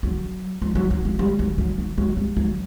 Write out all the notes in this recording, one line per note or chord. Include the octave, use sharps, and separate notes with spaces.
F#3
F3
F#3
F#3
F#3
G3
F#3
F#3
F#3
F#3
G3
F#3